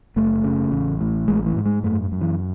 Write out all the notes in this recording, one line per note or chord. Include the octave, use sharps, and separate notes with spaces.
F#1 A3
C#3
A1
A2
A1 G#3
E3
G#2
G#3
F#2 A3
F#2
E3